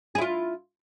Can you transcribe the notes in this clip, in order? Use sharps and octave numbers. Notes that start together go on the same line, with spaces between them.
E4 F4 G#4